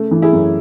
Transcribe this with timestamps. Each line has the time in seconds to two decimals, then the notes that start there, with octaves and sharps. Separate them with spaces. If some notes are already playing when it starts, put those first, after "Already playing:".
Already playing: C#3 A3
0.11 E3
0.22 E4 G#4
0.33 F#2